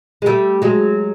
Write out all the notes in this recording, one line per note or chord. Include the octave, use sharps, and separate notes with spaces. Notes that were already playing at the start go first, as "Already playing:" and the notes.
G#3
G3 A3
F#3 G#3